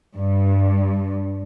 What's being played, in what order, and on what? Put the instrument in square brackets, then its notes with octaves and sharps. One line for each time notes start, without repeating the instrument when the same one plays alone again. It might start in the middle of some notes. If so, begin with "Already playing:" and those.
[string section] G2